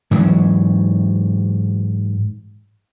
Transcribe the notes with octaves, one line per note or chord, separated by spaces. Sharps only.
G#2 E3 F#3